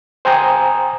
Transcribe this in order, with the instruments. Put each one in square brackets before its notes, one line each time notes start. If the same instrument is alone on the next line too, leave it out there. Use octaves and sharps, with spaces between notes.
[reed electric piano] C5 G5 G#5 A#5 D#6